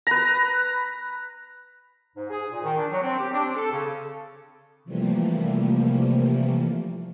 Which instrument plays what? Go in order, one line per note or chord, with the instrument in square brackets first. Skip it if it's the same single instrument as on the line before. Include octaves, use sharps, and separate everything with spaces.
[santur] B4 A#5
[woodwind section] G#2
G#4
A#2
D#3
D4
F#3
C4
G4
D4
C4
A4
C#3
[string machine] C3 E3 F3 G3 A3 A#3